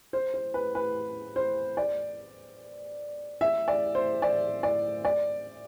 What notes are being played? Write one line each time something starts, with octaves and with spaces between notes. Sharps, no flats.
C5
C5
B4
B4
C5
D5
E5
D5
C5
D5
D5
D5